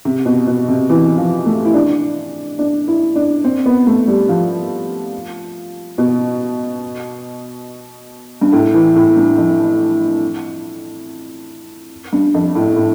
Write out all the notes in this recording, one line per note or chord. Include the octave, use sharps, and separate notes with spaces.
C3
B2
B2
C3
E3
F3
A3
E4
D4
D4
E4
D4
C4
B3
A3
G3
F3
B2
G2
A2
E3
A2
G2
F2
G2
F2
A2
A2